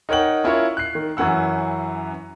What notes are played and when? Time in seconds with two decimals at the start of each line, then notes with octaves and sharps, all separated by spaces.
0.09 D#4 A#4 C#5 F#5 G5 F#7
0.44 C#4 E4 F4 A#4 C#5
0.77 F#6 C7
0.95 D#3
1.17 F#2 E3 C#4 F#5 E6